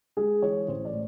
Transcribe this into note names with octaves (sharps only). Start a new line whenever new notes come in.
G#3 G#4
E3 C#5
A1 C5
D5
A2